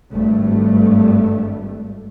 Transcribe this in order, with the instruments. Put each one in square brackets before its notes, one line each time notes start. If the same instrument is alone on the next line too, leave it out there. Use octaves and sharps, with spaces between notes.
[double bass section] G#1 G2 A3